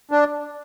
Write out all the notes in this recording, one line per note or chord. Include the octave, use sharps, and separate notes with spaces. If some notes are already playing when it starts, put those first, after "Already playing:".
D4